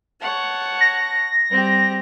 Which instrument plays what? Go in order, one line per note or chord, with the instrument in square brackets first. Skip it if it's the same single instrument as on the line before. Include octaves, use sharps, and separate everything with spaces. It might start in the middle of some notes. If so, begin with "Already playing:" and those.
[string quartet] C#5 F#5 A5
[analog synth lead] A#6
[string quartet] G3 C4 G4